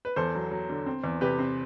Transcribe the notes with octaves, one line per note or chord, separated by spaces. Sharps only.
B4
E2 A4 C5
F#3
F#3
D3
C4
E2
C3 G4 B4
C4